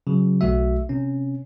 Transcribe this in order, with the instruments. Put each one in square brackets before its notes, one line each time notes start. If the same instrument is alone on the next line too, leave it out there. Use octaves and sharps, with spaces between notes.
[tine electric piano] C#3 F#3
B1 A3 F#4 E5
C3 C#4